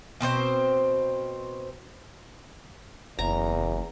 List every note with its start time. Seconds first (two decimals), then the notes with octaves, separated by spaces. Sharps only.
0.21 B2 C4 D4 C5
3.19 F#1 E2 A#5